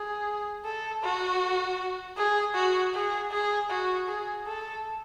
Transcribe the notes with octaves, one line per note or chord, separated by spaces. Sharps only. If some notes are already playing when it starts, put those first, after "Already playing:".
Already playing: G#4
A4
F#4
G#4
F#4
G#4
G#4
F#4
G#4
A4